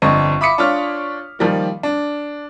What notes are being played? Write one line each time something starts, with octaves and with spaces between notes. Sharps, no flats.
G1 F2 C4 D4 D#5 C#6
E5 B5 D6 D#6 B6 C#7
D4 F4 C#5 F6
D#3 F3 G3 A#3
D4